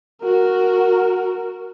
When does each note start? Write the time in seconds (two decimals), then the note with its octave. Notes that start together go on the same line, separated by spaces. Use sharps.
0.22 F#4 A#4